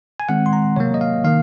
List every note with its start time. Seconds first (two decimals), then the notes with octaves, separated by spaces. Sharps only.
0.20 G#5
0.29 D#3 G#3 C4 F#5
0.46 C6
0.53 A#5
0.76 C3 F#3 A#3 C#5
0.94 D#5
1.01 F5
1.24 D#3 A#3 F5